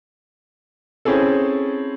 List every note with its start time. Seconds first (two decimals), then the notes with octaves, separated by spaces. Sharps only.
1.05 C4 C#4 E4 G#4 A4